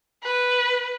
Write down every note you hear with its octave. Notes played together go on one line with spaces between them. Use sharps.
B4